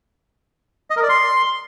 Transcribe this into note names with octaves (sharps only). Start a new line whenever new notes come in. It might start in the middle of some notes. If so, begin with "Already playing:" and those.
D#5
A#4
D5
C6